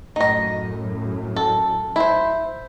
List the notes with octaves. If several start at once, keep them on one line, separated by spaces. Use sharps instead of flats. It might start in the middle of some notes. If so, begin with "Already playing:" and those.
F#2 A2 D#4 D#5
A4
E4 C5